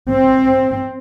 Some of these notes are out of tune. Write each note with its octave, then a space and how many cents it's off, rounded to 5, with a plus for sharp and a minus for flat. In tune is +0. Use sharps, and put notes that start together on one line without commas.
C4 +10